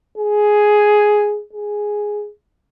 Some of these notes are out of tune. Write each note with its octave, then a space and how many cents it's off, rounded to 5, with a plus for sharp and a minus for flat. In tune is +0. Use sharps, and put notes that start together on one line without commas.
G#4 +5
G#4 +0